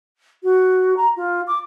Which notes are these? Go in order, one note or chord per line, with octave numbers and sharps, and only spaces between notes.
F#4
A#5
F4
D6